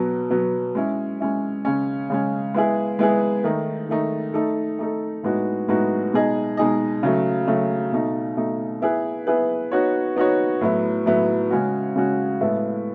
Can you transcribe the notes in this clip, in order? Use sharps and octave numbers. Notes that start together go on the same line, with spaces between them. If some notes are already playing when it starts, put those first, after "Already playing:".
Already playing: B2 F#3 B3
B2 F#3 B3
G#3 C#4 E4
G#3 C#4 E4
C#3 G#3 C#4
C#3 G#3 C#4
G#3 B3 E4 G#4
G#3 B3 E4 G#4
D#3 A3 D#4
D#3 A3 D#4
A3 D#4 A4
A3 D#4 A4
A2 G#3 B3 D#4 F#4
A2 G#3 B3 D#4 F#4
B2 G#3 D#4 G#4 D#5
B2 G#3 D#4 G#4 D#5
C#3 F#3 A3
C#3 F#3 A3
B2 A3 D#4
B2 A3 D#4
B3 E4 G#4 B4
B3 E4 G#4 B4
B3 D#4 F#4 C#5
B3 D#4 F#4 C#5
A2 F#3 B3 E4
A2 F#3 B3 E4
C#3 G#3 C#4 F#4
C#3 G#3 C#4 F#4
A2 G#3 B3 E4 A4